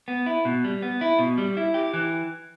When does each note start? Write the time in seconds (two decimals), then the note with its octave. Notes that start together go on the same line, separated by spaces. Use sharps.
0.08 B3
0.26 E4
0.45 B2
0.64 G3
0.82 B3
1.01 E4
1.19 B2
1.38 G3
1.57 E4
1.74 G4
1.94 E3